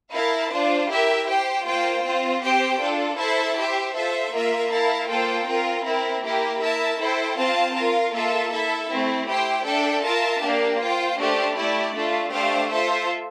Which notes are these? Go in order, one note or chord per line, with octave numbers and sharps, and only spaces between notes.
E4 A#4 F5 A5
D4 F4 C5
E4 G4 A#4 E5
G4 C5 G5
A#3 F4 C5 G5
C4 F4 C5
C4 G4 C5 G5
D4 F4 A4
E4 A4 C5 E5 A5
G4 C5 E5
F4 A4 C5 E5
A#3 F4 A#4 E5
E4 A#4 F5 A5
A#3 F4 A4 C5 G5
C4 F4 A#4
C4 E4 A#4
A#3 E4 G4 A#4
E4 A#4 E5 A5
E4 A4 C5 G5
C4 F4 C5 F5 A5
F4 A#4 F5
A#3 F4 A4 E5 A5
E4 A4 E5
A3 C4 E4
E4 G4 C5 G5
D4 A4 E5 G5
F4 A#4 E5 A5
A#3 D4 G4
F4 C5 G5
A3 D4 G4 C5
A3 E4 G4 D5
A3 D4 F4
A3 D4 G4 C5 F5
F4 A4 C5 E5